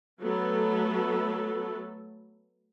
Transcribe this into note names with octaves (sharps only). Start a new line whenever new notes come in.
F#3 A3 B3 A4